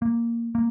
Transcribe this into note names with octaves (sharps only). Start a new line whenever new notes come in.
A#3
A#3